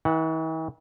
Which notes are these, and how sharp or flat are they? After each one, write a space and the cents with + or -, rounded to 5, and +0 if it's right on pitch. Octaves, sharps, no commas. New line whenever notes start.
E3 -45 F#5 +0